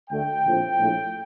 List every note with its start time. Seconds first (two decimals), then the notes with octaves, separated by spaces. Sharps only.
0.10 D2 D3 A3 G5
0.45 A#1 A2 F3 C4
0.79 A#1 A2 A3